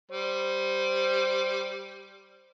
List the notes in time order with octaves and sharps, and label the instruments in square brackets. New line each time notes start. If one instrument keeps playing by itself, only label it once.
[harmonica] G3 [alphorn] C5